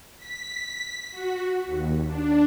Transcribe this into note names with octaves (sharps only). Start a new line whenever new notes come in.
B6
F#4
D#2
D4